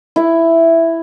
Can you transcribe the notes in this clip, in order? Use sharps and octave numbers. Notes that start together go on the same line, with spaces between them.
E4 E5